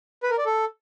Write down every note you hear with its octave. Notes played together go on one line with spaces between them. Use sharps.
B4
A#4
D5
A4